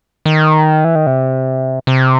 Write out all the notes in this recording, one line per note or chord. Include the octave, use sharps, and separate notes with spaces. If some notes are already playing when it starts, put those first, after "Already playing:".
D#3
E3
D#3
C3
C3